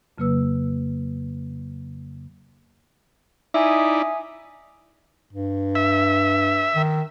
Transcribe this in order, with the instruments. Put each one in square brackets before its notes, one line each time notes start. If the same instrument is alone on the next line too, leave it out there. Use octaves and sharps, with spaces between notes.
[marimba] F2 C#3 F#3 A#3 B4 E6
[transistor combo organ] D#4 E4 D5 [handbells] E5 G#5 D#6
[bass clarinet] G2
[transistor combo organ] E5
[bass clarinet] D#3